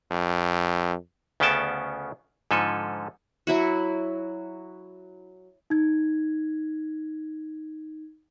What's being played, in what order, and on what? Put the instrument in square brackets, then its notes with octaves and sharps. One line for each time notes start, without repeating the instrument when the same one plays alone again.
[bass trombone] F2
[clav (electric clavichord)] D2 C#3 B3 C#4 G5 A5
G#2 D3 F3 C#4 A4 G#5
[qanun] F#3 E4 F#4
[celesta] D#4 G#6